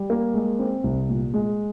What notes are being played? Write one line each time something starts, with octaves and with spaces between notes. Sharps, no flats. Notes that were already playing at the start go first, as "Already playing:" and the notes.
Already playing: G3
A#3
G#3
C4
C2
A#2
G#3